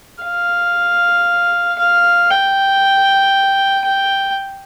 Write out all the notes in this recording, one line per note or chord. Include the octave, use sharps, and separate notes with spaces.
F5
F5
G5
G5